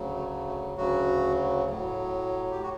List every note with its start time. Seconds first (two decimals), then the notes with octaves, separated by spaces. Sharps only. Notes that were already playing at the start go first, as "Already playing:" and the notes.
Already playing: D2 C#3 F#3
0.16 A3
0.47 A3
0.77 D2 C#3 F#3 F#4
1.70 A2 F#3
2.52 G4
2.62 A2 F#4